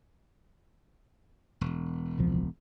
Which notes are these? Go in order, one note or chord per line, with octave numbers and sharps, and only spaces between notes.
E1
D#1 C2 F3